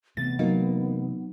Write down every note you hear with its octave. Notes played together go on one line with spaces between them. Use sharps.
C3 E3 A3 B3 A6
F#3 A#3 D#4